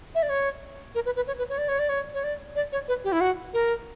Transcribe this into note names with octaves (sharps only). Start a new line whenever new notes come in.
E5
D5
C#5
A#4
B4
B4
C#5
B4
C#5
D5
C#5
D5
C#5
C#5
D5
D5
C#5
B4
G4
E4
F#4
A#4